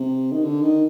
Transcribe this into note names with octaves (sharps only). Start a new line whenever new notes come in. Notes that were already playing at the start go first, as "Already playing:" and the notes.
Already playing: C3
D#3
D3
D#3